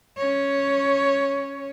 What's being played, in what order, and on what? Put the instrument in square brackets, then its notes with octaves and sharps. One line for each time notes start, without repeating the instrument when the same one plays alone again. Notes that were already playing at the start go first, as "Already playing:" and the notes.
[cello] C#4 C#5